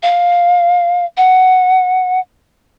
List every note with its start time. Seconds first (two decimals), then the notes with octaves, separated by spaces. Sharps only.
0.03 F5
1.17 F#5